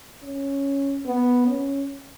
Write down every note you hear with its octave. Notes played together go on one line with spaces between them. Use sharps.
C#4
B3
C#4